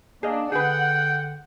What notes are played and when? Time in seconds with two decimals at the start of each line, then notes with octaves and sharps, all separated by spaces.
0.23 A#3 D4 G#4 D#5
0.52 D3 G#4 B4 F#5 G5